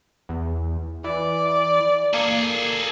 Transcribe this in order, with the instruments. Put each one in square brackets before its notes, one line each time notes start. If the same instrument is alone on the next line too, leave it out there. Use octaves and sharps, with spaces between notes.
[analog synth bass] E2
[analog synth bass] E3 [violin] D5
[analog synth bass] A#3 [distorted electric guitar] G#4 A4